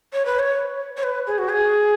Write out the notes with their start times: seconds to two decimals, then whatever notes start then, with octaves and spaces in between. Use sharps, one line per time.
0.13 C#5
0.25 B4
0.39 C#5
0.97 C#5
1.03 B4
1.27 G#4
1.38 F#4
1.49 G#4